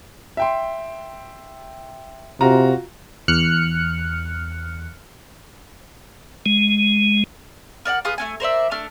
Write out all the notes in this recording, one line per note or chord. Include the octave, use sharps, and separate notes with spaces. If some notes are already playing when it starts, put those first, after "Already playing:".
E5 G5 C6
C3 F4 F#4 A#5
E2 F6 F#6 C#7
G#3
A#4 D5 F5 F#5
F4 G#4 B4 D#6
A3 C#4 G#5
A#4 C5 D5 E5
A3 D4 F6